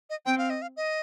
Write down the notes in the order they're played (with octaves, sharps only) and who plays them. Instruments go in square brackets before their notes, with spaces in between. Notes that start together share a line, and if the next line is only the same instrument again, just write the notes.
[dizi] D#5
[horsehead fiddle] C4 [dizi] G5
[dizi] F5
D#5
F5
D#5